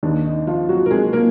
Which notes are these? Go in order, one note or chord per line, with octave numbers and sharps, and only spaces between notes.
D#2 D#3 D4
D#4
F3 F4
F#3 F#4
A#4
G#3 G#4
A#3 A#4